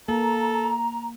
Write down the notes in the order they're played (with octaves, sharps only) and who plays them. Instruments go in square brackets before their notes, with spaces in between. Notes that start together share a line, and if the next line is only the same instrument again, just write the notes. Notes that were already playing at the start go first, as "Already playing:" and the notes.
[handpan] A#3 [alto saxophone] A4 [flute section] A#5